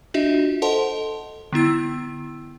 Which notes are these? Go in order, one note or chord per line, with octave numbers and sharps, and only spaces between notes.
D4 F4 F#4 D#5 E5
A4 C5 D#5 F#5 A5 C6
D3 B3 E4 E6